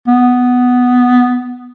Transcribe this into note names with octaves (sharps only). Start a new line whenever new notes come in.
B3